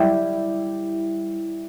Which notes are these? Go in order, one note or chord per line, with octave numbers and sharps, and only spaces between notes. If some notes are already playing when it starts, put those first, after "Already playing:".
Already playing: G3 E4 G4 E5